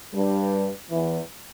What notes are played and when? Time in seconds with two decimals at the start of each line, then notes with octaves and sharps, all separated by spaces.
0.12 G2 G3
0.90 E2 E3